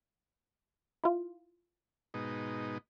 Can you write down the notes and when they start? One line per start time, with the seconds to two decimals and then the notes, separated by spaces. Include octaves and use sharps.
1.04 E4 F4
2.14 G#2 B2 D#4